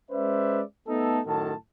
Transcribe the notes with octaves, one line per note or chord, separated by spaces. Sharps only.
G#3 C#4 B4 C5 D5 E5
A3 B3 D#4 A4
F#2 A2 D#3 F#4 A4 A5